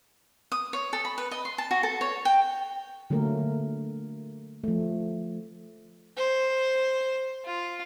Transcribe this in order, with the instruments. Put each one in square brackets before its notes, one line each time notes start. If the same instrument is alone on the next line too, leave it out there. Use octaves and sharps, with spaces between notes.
[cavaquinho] D#6
C#5
A4
B5
B4
D#5
C6
A5
F#4
A4
C#5
G5
[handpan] D3 F#3 A3 A#3 A#4
F3 A3
[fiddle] C5
F4